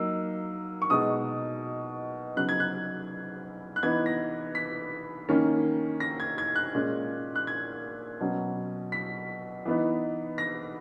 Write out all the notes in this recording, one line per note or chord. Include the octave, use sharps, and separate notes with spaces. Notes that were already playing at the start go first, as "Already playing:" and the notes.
Already playing: F#3 A#3 D#4 E6
C#6
B2 G#3 D#4 D#6
C#3 F#3 B3 D#4 F#6
G#6
F#6
F#6
E3 B3 D#4 G#6
A#6
B6
D#3 A#3 C#4
A#6
G#6
G#6
F#6
A#2 G#3 C#4
F#6
G#6
B2 F#3 C#4
B6
E3 B3 D#4
A#6